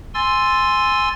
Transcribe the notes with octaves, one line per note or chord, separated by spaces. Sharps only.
G#5 C6 E6 A6